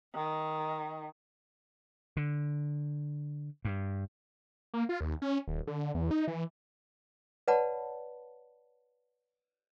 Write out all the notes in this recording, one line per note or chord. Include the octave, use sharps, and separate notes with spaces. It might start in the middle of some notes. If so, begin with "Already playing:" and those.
D#3
D3
G2
A#3
F4
D#2
C#4
D#1
D3
E2
D#4
E3
B4 C#5 D5 F#5 A5 B5